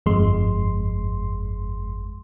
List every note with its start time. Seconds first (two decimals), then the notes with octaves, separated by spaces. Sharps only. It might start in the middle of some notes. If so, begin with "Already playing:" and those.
0.06 G1 F2 G#3 C6